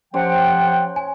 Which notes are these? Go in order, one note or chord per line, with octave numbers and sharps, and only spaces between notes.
F3 C#4 G4 C5 F#5 G5
G#5